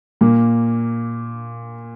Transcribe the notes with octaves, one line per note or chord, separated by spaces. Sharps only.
A#2 A#3